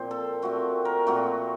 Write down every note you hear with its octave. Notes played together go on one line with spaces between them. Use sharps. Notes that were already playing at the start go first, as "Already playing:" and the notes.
Already playing: A#2 F3 C4 C5
A4
A#2 F3 A3 C4 F#4
A#4
A#2 F3 A3 C4 F#4